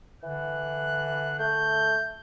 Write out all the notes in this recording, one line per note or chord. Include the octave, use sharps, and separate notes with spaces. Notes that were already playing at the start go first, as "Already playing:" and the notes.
D3 E3 F#6
A3 G6